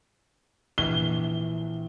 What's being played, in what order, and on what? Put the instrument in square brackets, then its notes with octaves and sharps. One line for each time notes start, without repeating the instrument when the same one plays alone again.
[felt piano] A#1 E3 [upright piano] G7